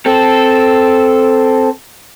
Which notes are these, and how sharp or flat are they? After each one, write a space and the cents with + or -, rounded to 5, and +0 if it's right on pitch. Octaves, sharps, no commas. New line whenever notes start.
C4 +0 A4 +0